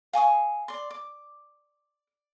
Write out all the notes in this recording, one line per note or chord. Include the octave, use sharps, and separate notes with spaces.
F5 G#5 C#6 D#6
D5 C6
D6